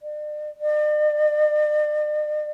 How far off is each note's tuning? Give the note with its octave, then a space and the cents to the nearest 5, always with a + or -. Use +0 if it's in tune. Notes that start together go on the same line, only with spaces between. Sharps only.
D5 +40
D5 +45